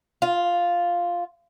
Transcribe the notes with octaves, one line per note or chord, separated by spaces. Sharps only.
F4